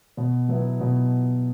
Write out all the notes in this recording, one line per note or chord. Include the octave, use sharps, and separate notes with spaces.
B2
F#3 B3 E4
B2